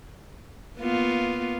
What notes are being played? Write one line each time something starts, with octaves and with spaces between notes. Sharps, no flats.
A#3 B3 F4